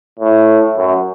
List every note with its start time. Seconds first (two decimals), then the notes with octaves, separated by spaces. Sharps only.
0.20 A2
0.77 F#2